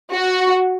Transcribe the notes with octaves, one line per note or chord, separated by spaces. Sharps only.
F#4